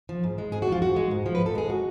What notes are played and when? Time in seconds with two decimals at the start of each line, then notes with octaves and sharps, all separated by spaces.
0.09 F3
0.24 G#2
0.38 G#3
0.52 G#2 G#4
0.62 F#4
0.67 F3 F4
0.82 G#2 F#4
0.96 G#3
1.11 G#2
1.26 F3
1.35 B4
1.41 G#2
1.46 A4
1.55 G#3 G#4
1.70 F#4